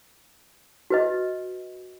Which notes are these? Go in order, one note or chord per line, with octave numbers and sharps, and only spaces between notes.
F#4 B4 D#5